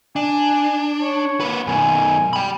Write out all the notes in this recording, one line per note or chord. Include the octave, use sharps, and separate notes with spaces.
D4 G#5
C#5
A#3 B4
F#2 B2 G#5
G5 B5